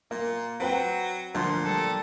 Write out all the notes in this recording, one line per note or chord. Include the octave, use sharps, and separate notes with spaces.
A#2 A#3
F#3 C4 B4 G5
D2 A#2 F3 C6
G3 A4 D#6